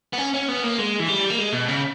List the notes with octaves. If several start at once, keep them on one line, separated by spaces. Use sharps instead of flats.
B3
C#4
C#4
B3
A#3
G#3
E3
G3
A#3
G#3
B2
C#3